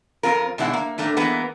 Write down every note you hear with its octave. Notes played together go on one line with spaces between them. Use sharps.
F2 C4 F4 A#4
B2 G#3 D4 E4 B4 F#5
A#3
A2 A3 A#3 D4
E3 G#3 A#3 B3